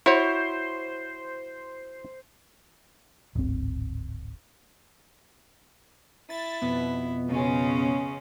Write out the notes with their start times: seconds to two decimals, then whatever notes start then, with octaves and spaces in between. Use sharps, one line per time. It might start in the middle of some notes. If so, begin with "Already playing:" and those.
0.06 E4 F#4 C5 C#5
3.35 D1 G#1 C4
6.30 E4 A6
6.62 F2 B2 B3
7.28 C#3 G#3 C#4